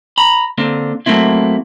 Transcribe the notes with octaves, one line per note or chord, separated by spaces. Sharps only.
A#5 B5
D3 A#3 C4
F#3 A3 A#3 C4 E4